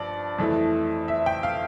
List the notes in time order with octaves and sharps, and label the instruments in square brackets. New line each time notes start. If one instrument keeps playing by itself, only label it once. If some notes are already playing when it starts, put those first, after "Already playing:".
Already playing: [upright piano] G2 F3 D5
F2 E3 A3
E5
G5
F5